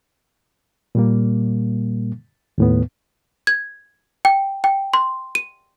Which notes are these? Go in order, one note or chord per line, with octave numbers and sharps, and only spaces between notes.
A#2 G3 A#3
D#2 A2 B3
G#6
G5
G5
C6
D#7